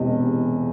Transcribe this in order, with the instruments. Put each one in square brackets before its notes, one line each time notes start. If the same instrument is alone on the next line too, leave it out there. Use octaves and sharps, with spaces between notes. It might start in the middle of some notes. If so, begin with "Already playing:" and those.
Already playing: [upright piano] E1 E2 C3 D#5